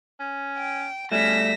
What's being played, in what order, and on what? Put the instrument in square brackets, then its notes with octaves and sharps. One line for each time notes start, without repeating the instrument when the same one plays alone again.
[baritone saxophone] C#4
[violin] G5
[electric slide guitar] G3 A3 [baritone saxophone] C#4 [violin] A#6 B6 [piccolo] E7